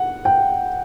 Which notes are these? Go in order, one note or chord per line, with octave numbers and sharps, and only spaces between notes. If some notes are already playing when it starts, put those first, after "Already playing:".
Already playing: F#5
G5